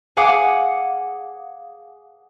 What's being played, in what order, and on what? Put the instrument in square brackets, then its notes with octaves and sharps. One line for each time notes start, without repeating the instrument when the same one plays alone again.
[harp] G#4 F5 F#5 G#5 D6 D#6